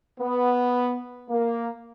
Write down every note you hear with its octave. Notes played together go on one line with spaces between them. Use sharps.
B3
A#3